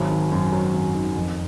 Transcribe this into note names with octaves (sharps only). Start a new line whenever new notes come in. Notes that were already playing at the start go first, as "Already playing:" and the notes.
Already playing: G#1 F#3
D#3
F#2
F#3
G#1
D#3
F2